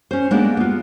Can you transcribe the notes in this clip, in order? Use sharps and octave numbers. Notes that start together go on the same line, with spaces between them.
C#4 C5
G#3 A#3 B3 D4 G4 D5
B3 F4